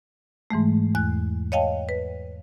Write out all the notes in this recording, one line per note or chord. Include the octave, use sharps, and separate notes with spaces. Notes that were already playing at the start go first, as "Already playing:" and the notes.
G#2 E3 G#3 A3
E2 F#6
C#5 D#5 F5 G5 A5
B4